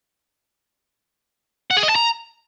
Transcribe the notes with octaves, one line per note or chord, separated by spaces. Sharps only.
F#5
G#4
D#5
A5
A#5